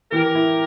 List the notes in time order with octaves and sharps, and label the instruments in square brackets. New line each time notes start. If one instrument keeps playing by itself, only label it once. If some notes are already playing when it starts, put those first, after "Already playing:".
[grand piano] E3 [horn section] G4 A#4
[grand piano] E4